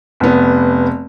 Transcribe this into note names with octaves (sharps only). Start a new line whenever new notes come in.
F1 B3